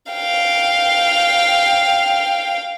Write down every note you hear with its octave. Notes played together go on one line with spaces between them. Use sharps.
F5 G5